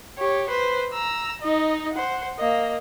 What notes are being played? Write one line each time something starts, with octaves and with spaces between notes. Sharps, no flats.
G4 C#5
B4 C5
A#5 E6
D#4 D#5
C5 F#5
A#3 D#5